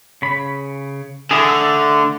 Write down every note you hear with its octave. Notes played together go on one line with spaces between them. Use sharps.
C#3 B5
D3 E4 G#4
A3 E6